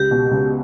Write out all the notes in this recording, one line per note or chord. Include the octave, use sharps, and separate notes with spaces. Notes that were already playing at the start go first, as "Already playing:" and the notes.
Already playing: C#2 G4
B2
C#2